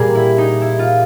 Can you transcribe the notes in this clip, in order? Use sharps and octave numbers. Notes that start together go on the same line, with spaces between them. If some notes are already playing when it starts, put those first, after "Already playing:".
Already playing: A#2 G3 G#4 A#4
E4
D#4
E4
F4